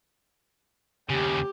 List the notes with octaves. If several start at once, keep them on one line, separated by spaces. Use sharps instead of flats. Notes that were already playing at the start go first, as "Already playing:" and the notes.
D#2 C#3 G4